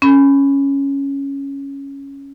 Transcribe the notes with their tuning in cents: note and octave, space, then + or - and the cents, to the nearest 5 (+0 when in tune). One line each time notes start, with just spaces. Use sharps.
C#4 +0 B5 +10